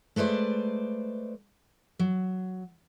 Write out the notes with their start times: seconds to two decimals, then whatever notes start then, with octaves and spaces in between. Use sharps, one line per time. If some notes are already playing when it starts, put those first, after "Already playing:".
0.16 G#3 A3 B4 C5 D5
1.99 F#3